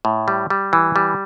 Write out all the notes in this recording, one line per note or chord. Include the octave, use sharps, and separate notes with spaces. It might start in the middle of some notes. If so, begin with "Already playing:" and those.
A2
G3
G3
E3
G3